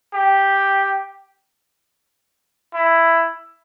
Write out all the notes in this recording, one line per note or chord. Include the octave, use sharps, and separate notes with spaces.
G4
E4